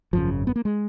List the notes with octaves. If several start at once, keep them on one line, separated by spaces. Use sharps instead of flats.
G#1 F#2 C#3 F3
B3
A#3
G#3